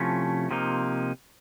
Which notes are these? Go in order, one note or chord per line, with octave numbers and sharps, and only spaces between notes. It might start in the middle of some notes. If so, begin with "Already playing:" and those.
Already playing: C3 F3 A3 C#4 E4
C3 F3 A#3 D#4